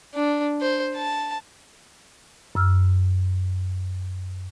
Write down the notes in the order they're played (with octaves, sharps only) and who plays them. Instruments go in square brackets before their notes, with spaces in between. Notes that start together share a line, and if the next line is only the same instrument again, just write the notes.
[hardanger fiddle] D4
C5
A5
[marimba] F#2 E6 F6